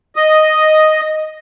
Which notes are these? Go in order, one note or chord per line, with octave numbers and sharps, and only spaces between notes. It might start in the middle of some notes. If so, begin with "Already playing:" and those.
D#5